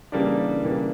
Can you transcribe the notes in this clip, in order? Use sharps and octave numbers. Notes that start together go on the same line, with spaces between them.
C#3 E3 G3 A#3 D4
C#3 E3 G3 A#3 D4